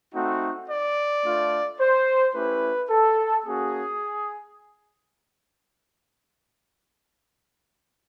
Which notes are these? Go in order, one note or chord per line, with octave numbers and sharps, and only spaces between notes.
A3 C4 D#4 F#4
D5
A3 D4 F4
C5
A3 C#4 E4 G4 B4
A4
A#3 C#4 F#4 G#4